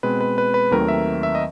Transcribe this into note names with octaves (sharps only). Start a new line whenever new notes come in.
B2 G#3 C4 B4
B4
B4
B4
D#2 D#3 F#3 A3 C4 A#4
E5
E5
D#5